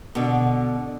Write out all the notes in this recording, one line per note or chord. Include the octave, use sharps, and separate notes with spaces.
B2 D3